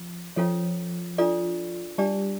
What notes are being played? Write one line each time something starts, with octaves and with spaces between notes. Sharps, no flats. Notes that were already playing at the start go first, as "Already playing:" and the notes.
Already playing: F3
F3 C#4 F4 A4 C#5
D4 F4 A4 D5
G3 D4 G4 D5 A5